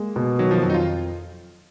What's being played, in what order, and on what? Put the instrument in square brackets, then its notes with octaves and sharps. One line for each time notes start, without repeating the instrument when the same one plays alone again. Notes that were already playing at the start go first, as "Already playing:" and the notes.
Already playing: [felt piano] G#3 [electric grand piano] A#3
[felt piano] B2
[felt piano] D#3 [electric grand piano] F#3
[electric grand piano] F3
[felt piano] F2 [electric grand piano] F#3
[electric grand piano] D#4
F4